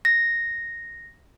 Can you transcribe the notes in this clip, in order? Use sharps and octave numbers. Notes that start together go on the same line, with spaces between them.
A#6